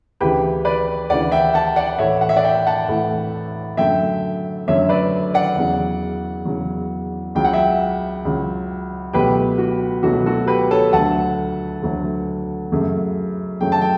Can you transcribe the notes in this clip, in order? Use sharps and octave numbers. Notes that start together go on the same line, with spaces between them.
D2 C#3 E3 G4 B4
B4 D5
D2 C#3 E3 D5 F#5
E5 G5
F#5 A5
D5 F#5
A2 E3 A3 C#5 E5
F#5
E5
D5 F#5
E5 G5
F#5 A5
A2 E3 A3
F#2 D3 F#3 A3 E5 G5
F#2 D3 F#3 A3 C#5 E5
B4 D5
D5 F#5
E2 C#3 F#3
E2 C#3 F#3
C#2 C#3 F#3 G5
F#5
E5 G5
C#2 C#3 F#3
C#2 B2 F#3 A3 G4 B4
F#4
C#2 B2 F#3 A3 F#4
F#4 A4
G4 B4
A4 C#5
D2 D3 F#3 A3 F#5 A5
D2 D3 F#3 A3
F#2 C#3 F#3 A3
F#2 C#3 F#3 A3 G5
A5
G5